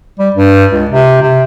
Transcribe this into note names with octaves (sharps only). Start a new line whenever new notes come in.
G3
G2
C#2
C3
C3